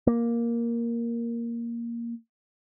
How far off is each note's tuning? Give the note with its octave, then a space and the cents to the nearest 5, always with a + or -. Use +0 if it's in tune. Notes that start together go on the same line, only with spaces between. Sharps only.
A#3 +5